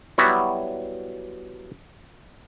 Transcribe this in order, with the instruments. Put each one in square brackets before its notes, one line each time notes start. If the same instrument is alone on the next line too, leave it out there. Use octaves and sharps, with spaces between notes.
[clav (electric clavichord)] F#3 G3 B3 E4 F#4